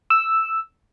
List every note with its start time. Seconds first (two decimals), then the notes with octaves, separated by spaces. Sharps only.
0.10 E6